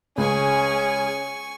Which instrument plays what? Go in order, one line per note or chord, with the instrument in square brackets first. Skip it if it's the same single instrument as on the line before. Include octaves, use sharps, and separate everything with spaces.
[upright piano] C#2 [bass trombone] C#4 [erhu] G#4 [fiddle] G#5 C#6